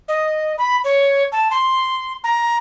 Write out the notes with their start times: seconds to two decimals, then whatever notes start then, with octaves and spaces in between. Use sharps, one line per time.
0.08 D#5
0.58 B5
0.84 C#5
1.32 A5
1.51 C6
2.24 A#5